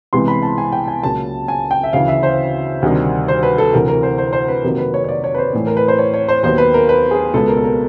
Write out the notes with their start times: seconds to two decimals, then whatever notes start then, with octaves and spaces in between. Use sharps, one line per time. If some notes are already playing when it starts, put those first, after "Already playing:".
0.13 C2 C3 E3 G#3 B3 C6
0.28 B5
0.43 A5
0.58 G#5
0.72 G5
0.88 G#5
1.03 C#2 C#3 F#3 A#3 A5
1.48 G#5
1.71 G5
1.84 E5
1.93 D2 C#3 E3 F5
2.08 E5
2.23 C5
2.82 D2 C3 D#3 G3
3.28 C5
3.43 B4
3.58 A4
3.73 D2 C3 E3 A#4
3.88 A#4
4.03 C5
4.18 C5
4.33 C5
4.48 B4
4.63 F2 C3 D#3 F#3 A#3 A#4
4.78 B4
4.94 C#5
5.04 C#5
5.09 D5
5.24 C#5
5.34 B4
5.38 C5
5.53 A2 E3 A3
5.67 A#4
5.77 B4
5.88 C5
5.99 C#5
6.14 C#5
6.28 C5
6.43 D#2 D#3 F#3 B3 C5
6.58 B4
6.74 A#4
6.89 B4
7.11 G#4
7.34 C#2 B2 G#3 B3 A4
7.48 A#4
7.57 A4
7.64 A#4